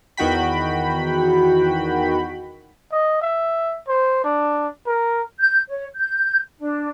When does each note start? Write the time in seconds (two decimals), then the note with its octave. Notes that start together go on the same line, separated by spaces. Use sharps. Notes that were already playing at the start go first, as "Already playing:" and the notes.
0.17 E2 D#3 F#4 G5 B5
2.92 D#5
3.21 E5
3.88 C5
4.24 D4
4.87 A#4
5.39 G6
5.69 C#5
5.96 G6
6.60 D4